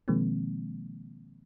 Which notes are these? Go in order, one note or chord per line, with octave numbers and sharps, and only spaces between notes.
B2 D#3 F3 G#3 A#3 C4